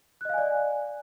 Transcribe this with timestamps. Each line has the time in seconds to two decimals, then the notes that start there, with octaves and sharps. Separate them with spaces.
0.21 F#6
0.25 D#5
0.29 F5
0.34 G#5
0.38 D5